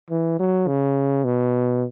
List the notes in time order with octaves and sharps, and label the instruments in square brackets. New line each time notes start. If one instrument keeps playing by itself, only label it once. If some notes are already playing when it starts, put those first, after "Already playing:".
[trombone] E3
F#3
C#3
B2